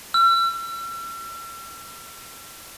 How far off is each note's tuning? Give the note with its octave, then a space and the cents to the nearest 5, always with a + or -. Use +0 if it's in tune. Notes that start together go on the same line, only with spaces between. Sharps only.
E6 +45